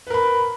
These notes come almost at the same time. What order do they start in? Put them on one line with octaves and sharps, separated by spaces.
B4 A#4 B5